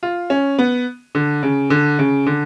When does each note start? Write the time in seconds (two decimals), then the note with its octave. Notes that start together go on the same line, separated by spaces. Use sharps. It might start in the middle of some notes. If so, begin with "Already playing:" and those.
0.03 F4
0.30 C#4
0.59 B3
1.15 D3
1.43 C#3
1.70 D3
1.99 C#3
2.27 D3